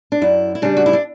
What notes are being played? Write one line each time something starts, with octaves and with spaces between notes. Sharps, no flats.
D4
F#2 E4
E4
C#3 G3 D4
F#4
E4
D4